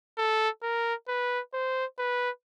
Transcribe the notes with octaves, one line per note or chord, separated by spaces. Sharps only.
A4
A#4
B4
C5
B4